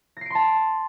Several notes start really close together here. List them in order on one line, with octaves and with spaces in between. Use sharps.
A#6 C7 D7 C6 A5